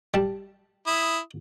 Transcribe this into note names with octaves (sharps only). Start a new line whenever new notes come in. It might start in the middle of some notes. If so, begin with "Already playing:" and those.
G3 A5
E4 D#6